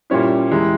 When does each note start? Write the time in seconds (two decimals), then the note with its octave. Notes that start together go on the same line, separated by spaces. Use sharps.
0.10 A#2 G3 C#4 E4
0.51 E2 E3 G#3 E4 G4